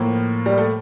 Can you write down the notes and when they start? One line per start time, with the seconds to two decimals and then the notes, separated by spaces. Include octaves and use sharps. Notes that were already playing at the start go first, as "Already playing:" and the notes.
Already playing: A2 F3 A#3
0.46 G3
0.57 A3